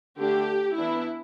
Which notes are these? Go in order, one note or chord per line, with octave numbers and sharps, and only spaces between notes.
D3 A3 D4 G4
E3 B3 D4 E4